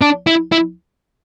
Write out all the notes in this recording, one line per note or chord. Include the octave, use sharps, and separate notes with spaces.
D4
E4
E4